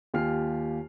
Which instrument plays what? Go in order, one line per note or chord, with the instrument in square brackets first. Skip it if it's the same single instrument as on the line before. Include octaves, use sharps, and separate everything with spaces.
[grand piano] D#2 F4 G4 G#5 F6 C7